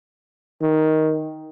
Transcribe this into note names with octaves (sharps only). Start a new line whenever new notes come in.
D#3